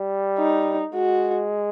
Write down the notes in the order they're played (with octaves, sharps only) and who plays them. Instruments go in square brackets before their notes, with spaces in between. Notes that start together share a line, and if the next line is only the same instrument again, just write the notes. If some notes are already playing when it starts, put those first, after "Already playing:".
Already playing: [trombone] G3
[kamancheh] D#4
[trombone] G#3 [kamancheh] F#4